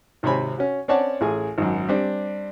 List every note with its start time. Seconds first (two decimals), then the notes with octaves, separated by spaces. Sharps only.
0.23 G#1 C3 C4 C#5 G#5 B5
0.58 C#4 F#4
0.88 C4 C#4 C#5 D5 F#5 A5
1.21 A1 A3 G#4 G#5
1.58 G#1 F#2
1.89 G3 C4 D4